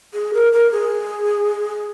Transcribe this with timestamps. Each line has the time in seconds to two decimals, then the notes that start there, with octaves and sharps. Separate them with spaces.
0.14 G#4
0.34 A#4
0.53 A#4
0.72 G#4